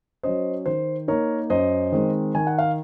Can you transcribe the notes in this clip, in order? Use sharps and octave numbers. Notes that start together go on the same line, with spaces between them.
F#3 C#4 C5 D#5
D#3 C5
A#3 D#4 A#4 C#5
F#2 C5 D#5
D#3 G#3 C4
D#3 G#5
F#5
F5